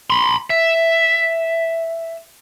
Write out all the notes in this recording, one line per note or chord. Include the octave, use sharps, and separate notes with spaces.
B5 C6
E5